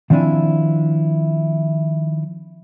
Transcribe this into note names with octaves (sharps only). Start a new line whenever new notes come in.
D#3 F3 C4 D4 E4 G#5